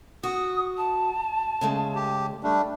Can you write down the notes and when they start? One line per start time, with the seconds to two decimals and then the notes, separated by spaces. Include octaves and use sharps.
0.23 F#4 D#6
0.77 A5
1.61 C#3 G#3 A3
1.95 G4
2.43 G3 A3 D4